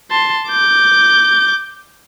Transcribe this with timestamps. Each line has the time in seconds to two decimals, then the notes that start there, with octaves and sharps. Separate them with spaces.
0.11 A5 C6
0.48 D6 G6